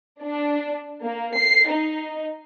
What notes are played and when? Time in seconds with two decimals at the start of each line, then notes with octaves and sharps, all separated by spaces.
0.22 D4
1.03 A#3
1.38 C7
1.69 D#4